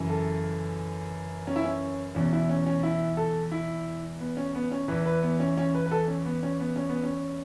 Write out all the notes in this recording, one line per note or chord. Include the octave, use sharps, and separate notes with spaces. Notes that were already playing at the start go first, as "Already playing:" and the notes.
Already playing: F#2 C#3 E3
A4
C#4
E4
C#4
E2 B2 C#4
E4
C#4
C#4
E4
A4
E4
B3
C#4
B3
C#4
E2 E3 B4
B4
B3
C#4
C#4
B4
B4
A4
C#4
B3
C#4
B3
C#4
B3
C#4